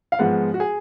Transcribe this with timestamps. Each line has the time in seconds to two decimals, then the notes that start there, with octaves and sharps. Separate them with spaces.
0.12 F5
0.19 G#2 F3 G#3 B3 F#5
0.54 F#4
0.60 G#4